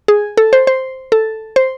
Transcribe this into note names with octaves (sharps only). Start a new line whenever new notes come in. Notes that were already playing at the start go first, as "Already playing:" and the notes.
G#4
A4
C5
C5
A4
C5